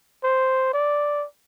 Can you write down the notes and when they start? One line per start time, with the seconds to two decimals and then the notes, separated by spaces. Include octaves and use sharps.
0.24 C5
0.73 D5